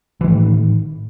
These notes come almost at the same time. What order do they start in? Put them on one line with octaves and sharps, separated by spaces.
E3 D#3 A2